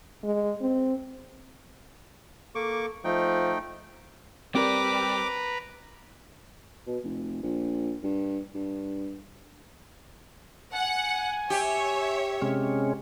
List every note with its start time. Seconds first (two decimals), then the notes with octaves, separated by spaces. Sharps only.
0.23 G#3
0.61 C4
2.55 A#3 A4 C#6 D6
3.05 F3 A3 D#4 G5
4.55 G3 C4 A#4 B4 D5 A#5 D6
6.87 B2
7.04 F1
7.43 A#1
8.03 G2
8.54 G2
10.73 F#5 G#5
11.50 G4 C#5 E5
12.42 C3 G#3 C#4